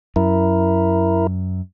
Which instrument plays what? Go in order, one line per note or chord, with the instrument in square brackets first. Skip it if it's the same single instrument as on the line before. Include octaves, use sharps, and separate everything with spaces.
[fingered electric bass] F#2 [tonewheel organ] E4 A#4